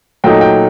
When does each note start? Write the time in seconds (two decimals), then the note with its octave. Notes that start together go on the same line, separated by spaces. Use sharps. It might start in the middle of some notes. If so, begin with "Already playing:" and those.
0.24 A#2 F#3 A3 D#4 G5
0.41 G5